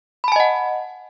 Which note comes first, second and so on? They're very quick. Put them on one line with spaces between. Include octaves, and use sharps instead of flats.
B5 A5 G#5 D#5 F#5